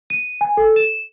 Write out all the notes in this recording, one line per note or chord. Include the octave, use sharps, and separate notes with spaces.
D#7
G#5
A4
E7